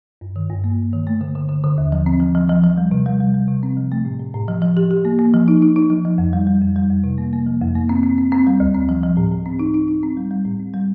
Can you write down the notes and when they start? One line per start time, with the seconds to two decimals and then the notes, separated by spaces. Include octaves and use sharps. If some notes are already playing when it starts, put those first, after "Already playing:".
0.21 G2
0.36 D#3
0.50 G2
0.64 A#3
0.79 G2
0.93 D#3
1.07 A3
1.21 D3
1.35 D3
1.49 D3
1.64 D3
1.78 D#2
1.92 F3
2.06 C4
2.20 F3
2.35 F3
2.49 F3
2.64 F3
2.77 G3
2.91 C3
3.06 G3
3.20 G3
3.34 G3
3.48 C3
3.63 C4
3.77 F3
3.92 A3
4.05 A2
4.19 A2
4.34 A2
4.48 F3
4.62 F3
4.77 G4
4.91 G4
5.05 A#3
5.19 A#3
5.34 F3
5.48 D#4
5.62 D#4
5.76 D#4
5.90 F3
6.05 F3
6.18 F2
6.33 G3
6.47 G3
6.61 F2
6.76 G3
6.90 F2
7.04 C3
7.18 A#3
7.33 A#3
7.46 F3
7.61 F2
7.75 A#3
7.89 C4
8.03 C4
8.18 C4
8.32 C4
8.47 G3
8.60 D2
8.75 C4
8.89 F3
9.03 F3
9.17 A2
9.31 A2
9.46 C4
9.59 D#4
9.74 D#4
9.88 D#4
10.03 C4
10.17 G3
10.31 G3
10.45 A2
10.60 C4
10.73 G3